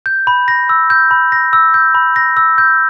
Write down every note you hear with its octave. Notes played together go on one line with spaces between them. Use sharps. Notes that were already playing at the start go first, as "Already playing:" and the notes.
G6
B5
A#6
E6
G6
B5
A#6
E6
G6
B5
A#6
E6
G6